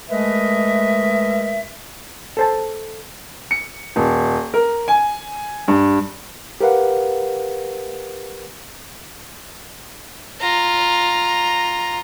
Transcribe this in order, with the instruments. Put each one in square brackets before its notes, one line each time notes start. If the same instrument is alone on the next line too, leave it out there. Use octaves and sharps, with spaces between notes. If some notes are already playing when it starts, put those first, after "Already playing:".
[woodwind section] G#3 A3 A#4 B4 D#5 E5
[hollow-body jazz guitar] A4 C5 A5
[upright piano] C#7
D#1
A#4
G#5
G2
[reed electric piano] G4 A#4 B4 F5 F#5
[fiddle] F4 A#5